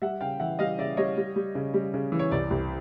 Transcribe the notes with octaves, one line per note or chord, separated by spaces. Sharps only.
G3 E5 F#5
C#3 F5 G5
E3 E5 F#5
G3 D#5 F5
C#3 D5 E5
G3 C#5 D#5
G3
G3
C#3
G3
C#3
E3
C#5
C2 D5
C2